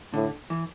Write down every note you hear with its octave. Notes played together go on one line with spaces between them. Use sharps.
A2 D3
E3